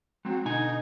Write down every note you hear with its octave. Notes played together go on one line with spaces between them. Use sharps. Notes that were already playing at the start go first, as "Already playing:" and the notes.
F#3 G#3 C4
B2 D3 D#4 G#5